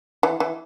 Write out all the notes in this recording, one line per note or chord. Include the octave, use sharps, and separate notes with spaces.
E3
E3